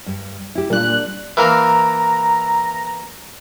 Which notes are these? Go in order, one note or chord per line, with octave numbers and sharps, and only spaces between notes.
G2
E4 G4
A#2 G3 D4 F#6
E3 A#3 F5 A#5